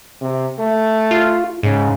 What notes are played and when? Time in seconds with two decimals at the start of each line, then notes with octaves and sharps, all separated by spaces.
0.21 C3
0.59 A3
1.11 F4
1.63 G#2 C#3